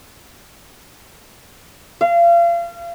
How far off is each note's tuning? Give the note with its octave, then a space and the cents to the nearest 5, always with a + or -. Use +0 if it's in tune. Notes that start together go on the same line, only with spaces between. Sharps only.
F5 -35